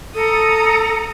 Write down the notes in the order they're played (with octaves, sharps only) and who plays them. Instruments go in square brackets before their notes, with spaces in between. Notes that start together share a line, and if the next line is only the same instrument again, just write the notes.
[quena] A4 [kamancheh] A#5 D#6